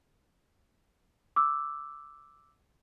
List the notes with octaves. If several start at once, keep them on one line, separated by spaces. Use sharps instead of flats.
D6 E6